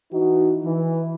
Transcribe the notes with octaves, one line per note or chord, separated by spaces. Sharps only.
E3 D#4 F#4
E3